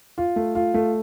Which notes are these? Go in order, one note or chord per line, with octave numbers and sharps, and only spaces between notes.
F4
A3
F4
A3